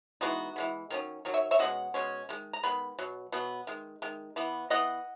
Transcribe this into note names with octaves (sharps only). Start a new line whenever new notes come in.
E3 G#3 B3 D#4 F#4
E3 G#3 B3
D#3 F#3 C#4
D#3 F#3
C#5 E5
C#5 E5
B2 G#3 C#4 D#5 F#5
B2 G#3 C#4
D#3 G#3
A#5
D#3 G#3 B3 B5
B2 F#3
B2 F#3 B3
D#3 G#3
D#3 G#3
E3 B3
E3 B3 D#5 F#5